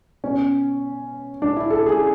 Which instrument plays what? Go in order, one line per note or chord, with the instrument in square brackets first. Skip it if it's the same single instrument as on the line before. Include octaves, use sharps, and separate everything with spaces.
[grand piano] B2 C#4
D4
E4
A4
G#4